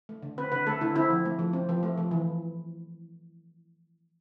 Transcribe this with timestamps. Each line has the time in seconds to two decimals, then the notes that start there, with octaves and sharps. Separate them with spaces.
0.09 A3
0.23 D3
0.38 C4 B4
0.52 D3 B4
0.67 A3 A4
0.81 D3 E4
0.95 C4 E4
1.10 F3
1.25 A3
1.39 F3
1.53 C4
1.69 F3
1.83 A3
1.97 F3
2.11 E3